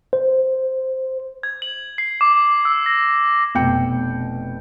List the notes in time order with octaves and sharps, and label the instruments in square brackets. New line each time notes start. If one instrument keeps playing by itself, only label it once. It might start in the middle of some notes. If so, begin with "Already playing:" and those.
[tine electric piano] C5
[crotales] G#6
F#7
C7
D6
E6
A#6
[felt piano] F1 B2 G5 G6 C#7